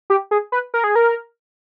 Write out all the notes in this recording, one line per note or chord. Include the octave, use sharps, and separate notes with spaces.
G4
G#4
B4
A#4
G#4
A#4